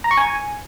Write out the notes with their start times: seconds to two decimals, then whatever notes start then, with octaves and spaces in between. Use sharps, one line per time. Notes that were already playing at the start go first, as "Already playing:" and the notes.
0.04 A#5
0.11 C#6
0.17 G#5